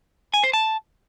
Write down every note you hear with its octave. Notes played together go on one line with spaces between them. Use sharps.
G#5
C5
A5